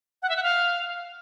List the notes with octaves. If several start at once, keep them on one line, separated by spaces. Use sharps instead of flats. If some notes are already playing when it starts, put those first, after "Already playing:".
F#5
E5
F#5
F5